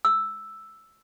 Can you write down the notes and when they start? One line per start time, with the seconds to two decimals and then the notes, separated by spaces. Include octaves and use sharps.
0.05 E6